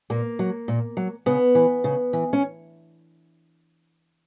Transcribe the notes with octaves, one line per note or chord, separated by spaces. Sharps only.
A#2 A#3
F#3
A#2
F#3
C#3 B3
E3
C#3
E3
C#4